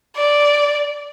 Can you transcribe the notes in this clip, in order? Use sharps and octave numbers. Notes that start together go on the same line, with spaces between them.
D5